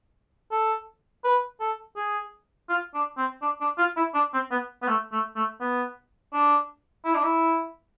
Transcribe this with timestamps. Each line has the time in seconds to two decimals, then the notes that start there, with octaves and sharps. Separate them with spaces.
0.51 A4
1.24 B4
1.60 A4
1.96 G#4
2.69 F4
2.94 D4
3.17 C4
3.42 D4
3.61 D4
3.78 F4
3.96 E4
4.14 D4
4.33 C4
4.51 B3
4.82 B3
4.88 A3
5.12 A3
5.36 A3
5.60 B3
6.33 D4
7.05 E4
7.15 D4
7.23 E4